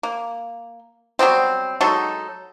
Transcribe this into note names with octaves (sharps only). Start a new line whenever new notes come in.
A#3
F#3 G3 B3 C4
F#3 G#3 D#4 A4